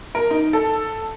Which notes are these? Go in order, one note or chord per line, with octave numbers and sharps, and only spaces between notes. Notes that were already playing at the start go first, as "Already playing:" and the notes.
A#4
D#4
A4